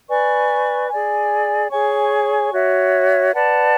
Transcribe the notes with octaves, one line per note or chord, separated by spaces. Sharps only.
B4 D5 G#5 C#6
G#4 D5 G#5
G#4 C#5 G#5 C#6
F#4 C#5 E5
B4 D5 F#5 A5